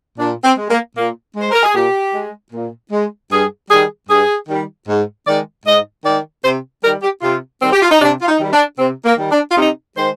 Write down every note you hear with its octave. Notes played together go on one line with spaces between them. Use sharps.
A#2 D4
C4
G#3
A#3
A#2 A#3
G#3 C5
A#4
G#4
A#2 G4
G#3
A#2
G#3
G2 G#4
D#3 G3 G#4
G2 G#4
D#3 G3
G#2
D#3 G#3 D5
G#2 D#5
D#3 G#3 D5
C3 C5
D#3 G3 A#4
G4
C3 F4
D#3 G3 C4
G4
F4
D#4
C3 D4
F4
D#4
D#3 G3
D4
C3 C4
A#3
D#3 G3
D4
F4
C3 D#4
D#3 G#3 C5